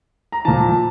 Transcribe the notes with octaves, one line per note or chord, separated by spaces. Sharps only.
A#5
A#2 F3 A5